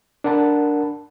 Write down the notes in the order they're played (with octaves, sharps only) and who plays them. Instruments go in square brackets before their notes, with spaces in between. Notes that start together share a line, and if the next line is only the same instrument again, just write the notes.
[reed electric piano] D4 A#4 F#5 A5 B5